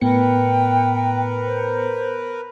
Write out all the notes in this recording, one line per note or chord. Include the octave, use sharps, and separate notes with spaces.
A2 B3 A#4 B4 G5 C#7
C5